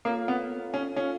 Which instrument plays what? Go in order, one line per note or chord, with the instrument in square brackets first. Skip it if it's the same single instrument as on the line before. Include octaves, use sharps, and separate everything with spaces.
[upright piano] A#3 [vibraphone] F4 A4 C#5 F5
[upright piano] B3
C#4
[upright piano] C#4 [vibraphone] F4 A4 C#5 F5